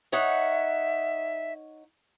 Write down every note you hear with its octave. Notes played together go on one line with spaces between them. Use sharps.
D#4 C#5 E5 F#5